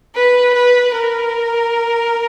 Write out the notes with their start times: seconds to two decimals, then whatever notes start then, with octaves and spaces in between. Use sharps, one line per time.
0.15 B4
0.54 B4
0.94 A#4